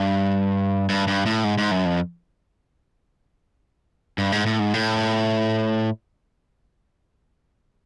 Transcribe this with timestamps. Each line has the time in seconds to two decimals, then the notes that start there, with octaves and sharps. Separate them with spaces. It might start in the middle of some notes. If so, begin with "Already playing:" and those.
Already playing: G2
0.89 G2
1.08 G2
1.26 A2
1.44 G#2
1.58 G#2
1.71 F#2
1.85 F2
4.18 G2
4.32 G#2
4.46 A2
4.59 G#2
4.74 A2